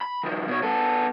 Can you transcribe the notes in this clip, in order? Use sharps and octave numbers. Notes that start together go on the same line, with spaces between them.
B5
D#3 F3
B2 C#5
B3 A4